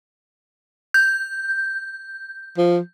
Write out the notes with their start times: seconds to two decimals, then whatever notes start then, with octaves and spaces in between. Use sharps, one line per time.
0.94 G6
2.58 F3